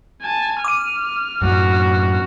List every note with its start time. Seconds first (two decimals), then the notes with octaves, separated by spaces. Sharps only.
0.22 G#5 A5
0.64 D6 F6 D#7
1.42 F#2 A2 F#3 F#4